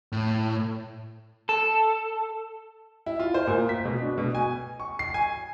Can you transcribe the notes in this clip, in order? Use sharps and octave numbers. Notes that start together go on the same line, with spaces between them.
A2
A4
E4
F4
C5
A#2
B6
B2
D4
B2
G#5
C#6
C7
G#5